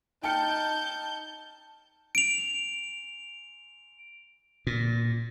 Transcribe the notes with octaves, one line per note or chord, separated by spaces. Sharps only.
D#4 G5 A5 F6 G6 C#7
D7 F7
A#2